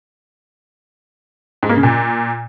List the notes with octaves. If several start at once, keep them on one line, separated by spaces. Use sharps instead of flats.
G#2
A#3
C#3
A#2